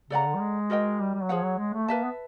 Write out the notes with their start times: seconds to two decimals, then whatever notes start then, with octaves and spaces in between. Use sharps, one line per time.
0.10 C#3 A4 D5 F#5 A#5
0.26 D3
0.35 G3
0.40 G#3
0.70 F#4 A#4 D#5 G5
1.00 G3
1.14 G3
1.23 F#3
1.29 F3 G#4 C#5 F#5
1.43 F#3
1.58 G#3
1.74 A3
1.88 A#3 B4 E5 A5
2.04 B3